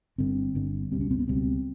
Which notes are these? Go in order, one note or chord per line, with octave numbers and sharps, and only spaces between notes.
G1 G2 D3 C4
G1 G2 D3
C#2 B2 G3 C4
C#4
C4
B3
C#2 B2 G3 C4